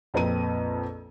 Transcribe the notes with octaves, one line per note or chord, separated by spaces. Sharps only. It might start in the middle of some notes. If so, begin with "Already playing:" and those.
A#1 F2 C4 B4 A#5 D#7